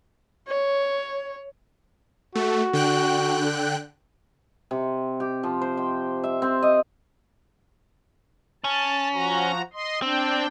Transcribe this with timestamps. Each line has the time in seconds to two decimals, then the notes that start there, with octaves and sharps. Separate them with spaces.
0.48 C#5
2.35 A3 F#4
2.73 D3 G5 F#6
4.71 C3
5.20 G4
5.43 F3
5.61 C5
5.77 G5
6.24 E5
6.42 C4
6.62 D#5
8.64 C#4 A5
9.13 F3 F#4 A#5
9.73 D#5 C6
10.02 C4 D4 G5